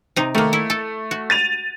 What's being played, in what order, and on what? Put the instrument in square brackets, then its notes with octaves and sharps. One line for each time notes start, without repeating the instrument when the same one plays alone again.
[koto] C3 D#4
[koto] D#3 A#3 [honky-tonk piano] A3
[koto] E4
A4
F#4
[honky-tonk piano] A6 D#7 F7